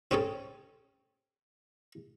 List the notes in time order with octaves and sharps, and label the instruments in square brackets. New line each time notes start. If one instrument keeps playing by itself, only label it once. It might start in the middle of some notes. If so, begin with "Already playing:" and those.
[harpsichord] C4 C#4 G#4 A4